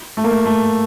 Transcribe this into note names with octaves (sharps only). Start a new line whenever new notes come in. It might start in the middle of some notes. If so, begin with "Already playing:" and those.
A3
A#3
A3
A3